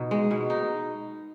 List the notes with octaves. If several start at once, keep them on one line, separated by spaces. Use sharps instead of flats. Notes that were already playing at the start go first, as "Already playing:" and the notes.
Already playing: B2 D#4
G#3
B2
D#4